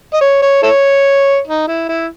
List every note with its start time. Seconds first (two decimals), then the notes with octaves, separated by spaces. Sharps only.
0.14 D#5
0.21 C#5
0.42 C#5
0.63 E4 A4 C#5
1.47 D#4
1.68 E4
1.89 E4